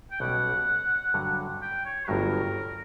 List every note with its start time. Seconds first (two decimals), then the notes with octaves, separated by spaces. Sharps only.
0.11 G5
0.20 B1 B2 G3 C#4 F#5
1.14 G2 D3 F#3
1.62 G5
1.85 C#5
2.08 G1 G2 F#3 A#4